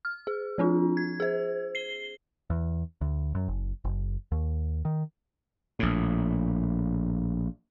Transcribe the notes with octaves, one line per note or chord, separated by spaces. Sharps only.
F6
G#4
F3 C4 D4 F4
G#6
G#4 C5
C7 G7
E2
D2
F#2
F#1
F#1
D#2
D#3
A#1 A2